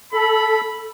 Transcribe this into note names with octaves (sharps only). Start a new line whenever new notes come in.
A4 B5